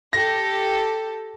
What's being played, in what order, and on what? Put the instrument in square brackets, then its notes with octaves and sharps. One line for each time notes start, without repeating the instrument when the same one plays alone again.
[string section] G4 A4 [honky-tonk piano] A#6